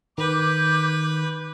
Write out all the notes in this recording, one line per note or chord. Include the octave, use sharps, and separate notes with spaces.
D#3 B4 D6 G6